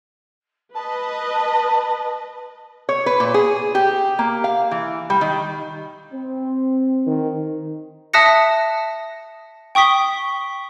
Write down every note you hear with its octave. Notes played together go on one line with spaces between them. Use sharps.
B4 D#5 A5
C#5
B4
A#2
G#4
G4
A#3
F5
E3
G3
D#3
C4
D#3
E5 A5 D#6 F#6 A#6 C#7
G5 C#6 D#6 B6 G7